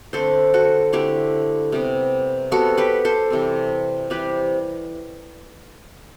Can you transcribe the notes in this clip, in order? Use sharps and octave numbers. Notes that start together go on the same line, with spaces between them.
D3 A3 C4 A4 C5
F#4 A4
D3 A3 C4 E4 G4
C3 G3 B3
C3 G3 B3 F#4 A4
G4 B4
A4 C5
C3 E3 G3 C4
C3 E3 G3 C4 G4 B4